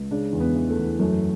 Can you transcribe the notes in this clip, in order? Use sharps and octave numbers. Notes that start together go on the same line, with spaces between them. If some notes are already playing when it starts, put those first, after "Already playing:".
Already playing: C#2
C#3 D4
E2
B3
E3
A3
E2
F#2 A3